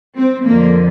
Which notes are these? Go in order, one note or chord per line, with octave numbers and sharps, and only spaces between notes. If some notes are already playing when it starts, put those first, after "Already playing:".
C4
F2 D3 F3 A#3